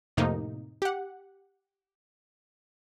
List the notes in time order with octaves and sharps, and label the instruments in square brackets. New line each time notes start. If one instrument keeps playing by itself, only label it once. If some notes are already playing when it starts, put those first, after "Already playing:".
[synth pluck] F2 A2 C3 A#3 D#4
G4 F#5